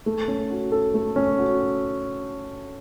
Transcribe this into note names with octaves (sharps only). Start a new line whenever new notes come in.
A3
C#4
F#4
A4
A3
C#4
F#4